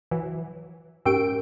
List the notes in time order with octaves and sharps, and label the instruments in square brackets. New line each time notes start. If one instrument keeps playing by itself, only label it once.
[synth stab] E3 F#3
[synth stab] G#2 G5 D7 [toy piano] C#4 G4 A#4